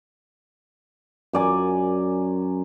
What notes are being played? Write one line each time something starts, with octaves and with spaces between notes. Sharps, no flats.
F#2 D5 G#5